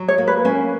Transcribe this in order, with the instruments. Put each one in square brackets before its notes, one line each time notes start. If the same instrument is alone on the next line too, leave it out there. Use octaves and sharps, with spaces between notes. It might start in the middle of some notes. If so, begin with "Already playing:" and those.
Already playing: [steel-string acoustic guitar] F#3
[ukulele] C#5
[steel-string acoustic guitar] A#3
[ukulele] B4
[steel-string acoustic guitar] A#3 [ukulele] C#4